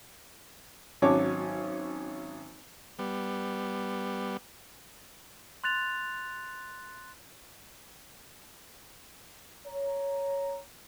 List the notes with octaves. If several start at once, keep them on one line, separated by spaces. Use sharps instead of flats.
G#1 F#3 C#4 C#5 A5 D6
G3 B3
C6 F#6 A6 F7
C#5 A#5